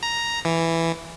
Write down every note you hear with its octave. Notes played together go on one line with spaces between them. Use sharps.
A#5
E3